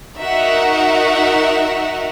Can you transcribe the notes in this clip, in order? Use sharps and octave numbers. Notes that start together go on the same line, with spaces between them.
D#4 F#4 A#4 E5 F#5